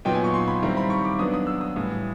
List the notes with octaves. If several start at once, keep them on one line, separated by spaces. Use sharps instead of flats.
A#2 F#3 B3 D#4 G5
G#5
C#6
C6
B5
D#3 G3 C4 E4 A#5
B5
C#6
D6
F#3 B3 D4 D#6
D#6
E6
D#6
A2 E3 G3 D#6